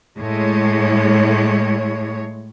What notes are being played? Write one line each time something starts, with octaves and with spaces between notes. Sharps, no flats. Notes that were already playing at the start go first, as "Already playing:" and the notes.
A2 G#3 C#5